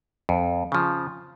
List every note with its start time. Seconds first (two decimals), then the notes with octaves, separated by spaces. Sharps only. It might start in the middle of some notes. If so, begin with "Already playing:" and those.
0.29 F2
0.72 C#3 F3